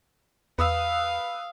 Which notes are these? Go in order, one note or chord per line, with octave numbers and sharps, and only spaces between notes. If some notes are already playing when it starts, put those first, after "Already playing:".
E2 B4 F5 D#6 E6